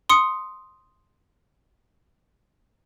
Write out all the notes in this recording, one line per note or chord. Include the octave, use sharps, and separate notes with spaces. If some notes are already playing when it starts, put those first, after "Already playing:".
C6 D#6 C#7